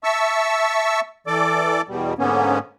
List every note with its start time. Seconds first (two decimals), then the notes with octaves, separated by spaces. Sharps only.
0.04 E5 A5 C#6 E6
1.27 E3 A4 D5 D6
1.88 E2 B2 G3
2.19 G#2 D3 A#3 B3 C#4